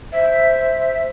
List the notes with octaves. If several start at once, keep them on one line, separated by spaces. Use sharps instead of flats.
C5 E5